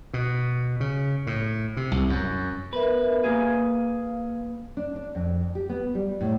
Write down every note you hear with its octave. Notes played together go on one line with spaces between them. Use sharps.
B2
C#3
A2
C3
C2
F#2
B3 A#4 B4 E5
A#3 G#4 F5
D4
D4
F2
G4
B3
G3
A2